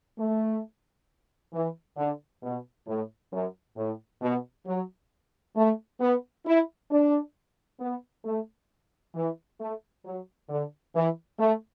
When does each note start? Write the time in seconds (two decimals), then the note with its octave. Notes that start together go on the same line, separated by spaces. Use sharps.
0.18 A3
1.53 E3
1.97 D3
2.42 B2
2.87 A2
3.31 F#2
3.76 A2
4.21 B2
4.65 F#3
5.56 A3
6.00 B3
6.46 E4
6.90 D4
7.80 B3
8.24 A3
9.15 E3
9.59 A3
10.04 F#3
10.49 D3
10.94 E3
11.38 A3